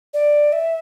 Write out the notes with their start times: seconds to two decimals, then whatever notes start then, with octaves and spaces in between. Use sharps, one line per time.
0.14 D5
0.53 E5